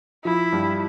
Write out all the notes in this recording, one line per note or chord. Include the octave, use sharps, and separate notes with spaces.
F3 E4
G2